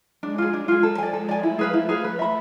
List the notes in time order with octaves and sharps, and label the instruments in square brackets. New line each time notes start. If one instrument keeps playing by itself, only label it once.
[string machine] G#3 [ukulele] D4
[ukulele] F4 G#4
D4
F4 G#4
[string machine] F3 [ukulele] A4
[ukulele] D5 G#5
[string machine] G#3 [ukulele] A4
[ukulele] D5 G#5
[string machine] F3 A3 [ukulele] E4
[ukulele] G#4 B4 F5
E4
G#4 B4 F5
B4
E5 B5